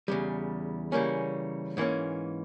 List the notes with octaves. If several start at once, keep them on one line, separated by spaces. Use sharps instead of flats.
E2 C#3 G3
C#3 E3 G3 A#3 C#4
G#2 E3 A#3 C#4